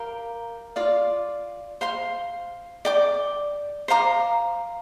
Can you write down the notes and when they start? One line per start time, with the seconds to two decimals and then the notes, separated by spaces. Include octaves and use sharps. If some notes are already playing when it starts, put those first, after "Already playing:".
Already playing: G4 A#4 F5
0.76 F4 D5 F5
1.81 C5 F5 C6
2.85 D5 G5 D6
3.88 C5 F5 A#5 D6